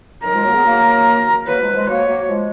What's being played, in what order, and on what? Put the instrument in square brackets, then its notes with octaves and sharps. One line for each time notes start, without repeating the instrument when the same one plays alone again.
[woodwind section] D#3 F#3 [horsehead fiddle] A#4
[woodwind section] F3 G#3
F#3 A#3
G#3 B3
F#3 A#3
[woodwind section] F#3 A#3 [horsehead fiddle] B4
[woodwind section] F3 G#3
F3 G#3
[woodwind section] F#3 A#3 [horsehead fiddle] C#5
[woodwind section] F#3 A#3
F3 G#3